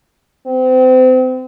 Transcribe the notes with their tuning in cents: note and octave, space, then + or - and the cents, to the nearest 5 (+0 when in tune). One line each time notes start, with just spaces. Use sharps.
C4 -30